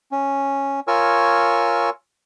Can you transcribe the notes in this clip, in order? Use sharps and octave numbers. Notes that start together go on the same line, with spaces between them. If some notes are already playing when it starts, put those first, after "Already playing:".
C#4
F4 A#4 C#5 G#5 C#6 E6